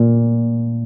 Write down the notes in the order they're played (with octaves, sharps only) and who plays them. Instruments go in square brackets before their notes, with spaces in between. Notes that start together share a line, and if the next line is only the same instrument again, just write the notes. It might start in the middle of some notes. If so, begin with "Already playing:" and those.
Already playing: [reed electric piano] A#2